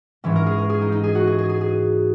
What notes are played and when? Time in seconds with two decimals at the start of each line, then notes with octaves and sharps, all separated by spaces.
0.24 G#2 E3 C#4
0.36 A#4
0.46 G#4
0.58 A#4
0.70 G#4
0.82 D#4
0.92 D#4
1.04 G#4
1.15 F#4
1.27 G#4
1.38 G#4
1.49 G#4
1.61 G#4